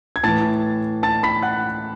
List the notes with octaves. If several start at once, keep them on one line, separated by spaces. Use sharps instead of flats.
G#6
A2 E3 A5 A6
A5 A6
B5 B6
F#5 F#6